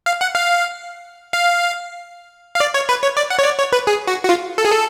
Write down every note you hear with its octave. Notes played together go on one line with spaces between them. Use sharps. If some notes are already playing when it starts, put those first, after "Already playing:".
F5
F#5
F5
F5
F5
D5
C#5
B4
C#5
D5
F#5
C#5
D5
C#5
B4
G#4
F#4
F#4
F4
A4
G#4
A4